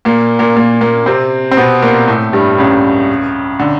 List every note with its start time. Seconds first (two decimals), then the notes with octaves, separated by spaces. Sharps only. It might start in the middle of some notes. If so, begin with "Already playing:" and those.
0.05 A#2 A#3
0.39 A#2 A#3
0.56 A#2 A#3
0.81 A#2 A#3
1.06 C3 C4
1.51 C4
1.57 B2 B3
1.82 A#2 A#3
2.08 A2 A3
2.33 G2 G3
2.58 C#2 C#3
3.60 D3